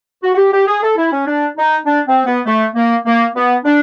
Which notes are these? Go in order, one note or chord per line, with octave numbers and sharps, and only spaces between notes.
F#4
F#4
G4
G4
G#4
A4
E4
C#4
D4
D#4
D4
C4
B3
A3
A#3
A#3
B3
D4